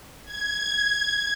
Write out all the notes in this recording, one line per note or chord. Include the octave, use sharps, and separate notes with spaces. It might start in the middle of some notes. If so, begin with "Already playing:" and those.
G#6